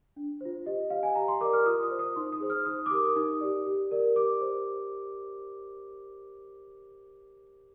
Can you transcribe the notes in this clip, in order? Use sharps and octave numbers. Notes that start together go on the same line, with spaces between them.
D4
F4 C5
G4 D#5
C5 F5
G#5
G4 A#5
C6
A#4 D5 D6
F6
F4 D#6
D#6
C5
D#6
D#4 C6
D#6
G#4 C5
F6
D#4 D#6
D6
G4 A#4 D#6
D#4 D#6
G4 D5
G4
A#4 D5
G4 D6
C5